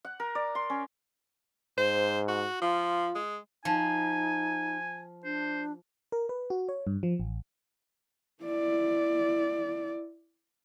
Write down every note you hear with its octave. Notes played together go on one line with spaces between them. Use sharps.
F#5
A#4
D5
C6
C#4
G#2 C5
F#4
F3 F4
G#3
F3 D#4 G#5
D4 C5
A#4
B4
F#4
C#5
G2
F3
A1
E4 D5